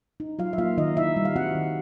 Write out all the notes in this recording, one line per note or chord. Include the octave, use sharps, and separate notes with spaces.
D#4
F#3 F4 F5
E5
A#3 F4 F5
D#3 D#4 D#5
D#4 E4 E5
G3
F5
C4 F#4 F#5
D#3